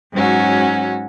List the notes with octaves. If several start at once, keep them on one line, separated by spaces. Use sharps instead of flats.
G#2 F#3 C#4 F#4